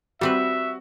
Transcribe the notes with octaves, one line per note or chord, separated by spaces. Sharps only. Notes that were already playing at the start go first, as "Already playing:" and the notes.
G3 C4 F#4 B4 E5